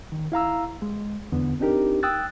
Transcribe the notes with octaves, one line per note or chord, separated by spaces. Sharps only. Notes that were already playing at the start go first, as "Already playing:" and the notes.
D#3
E4 F5 A#5 E6
G#3
E2 D3 B3
C4 D4 D#4 G4 A#4
G5 D#6 E6 F#6 A6